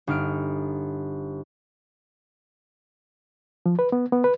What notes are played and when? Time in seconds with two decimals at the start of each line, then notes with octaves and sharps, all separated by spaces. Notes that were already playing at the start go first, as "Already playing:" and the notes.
0.07 G1 D#4 F6 D7
3.66 F3
3.79 B4
3.92 B3
4.12 B3
4.24 B4